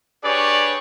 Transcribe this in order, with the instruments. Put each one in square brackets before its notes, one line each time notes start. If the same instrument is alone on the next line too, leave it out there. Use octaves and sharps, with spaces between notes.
[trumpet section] D4 G4 G#4 B4 C#5 D5